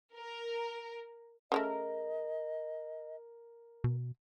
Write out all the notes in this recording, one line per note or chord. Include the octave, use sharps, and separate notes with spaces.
A#4
C#3 G#3 A3 A#4 D#5
B2